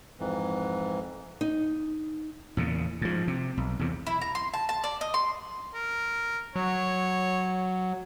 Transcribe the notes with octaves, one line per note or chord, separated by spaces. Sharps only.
F2 G#2 E3
D#4
E2 A#2 C#3
G#2 F3
C3
B1
E2 C3
E4
A#5
C6
A5
A5
D5
D#5
C6
A#4
F#3 C#5